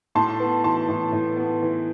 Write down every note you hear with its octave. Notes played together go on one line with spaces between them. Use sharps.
A2 A5 C6
B3
E3 A5 C6
A2
A2
B3
E3